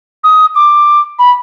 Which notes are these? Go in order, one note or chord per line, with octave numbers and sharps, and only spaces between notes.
D#6
D6
B5